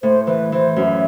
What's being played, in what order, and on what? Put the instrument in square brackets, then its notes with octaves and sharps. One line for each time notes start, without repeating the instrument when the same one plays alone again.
[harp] A2 [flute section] C5
[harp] E3 [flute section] B4
[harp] E3 [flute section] C5
[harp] F#2 [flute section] E5